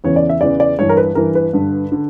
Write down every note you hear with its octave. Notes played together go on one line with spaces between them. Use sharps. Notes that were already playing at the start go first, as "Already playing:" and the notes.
E2 C#3 E3 C#5
D5
E5
E2 C#3 E3 D5
D5
G2 E3 C#5
A#4
B4
G2 E3 A#4
B4
G2 D3
D3